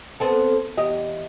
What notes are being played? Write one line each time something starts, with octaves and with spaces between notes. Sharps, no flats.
B3 C4 A4
E2 G4 D#5